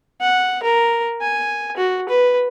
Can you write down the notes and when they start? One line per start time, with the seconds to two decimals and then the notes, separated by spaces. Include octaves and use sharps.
0.21 F#5
0.63 A#4
1.21 G#5
1.77 F#4
2.09 B4